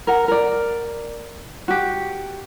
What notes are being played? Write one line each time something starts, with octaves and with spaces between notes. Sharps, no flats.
A#4 F#5
A#4 D5
F#4 G4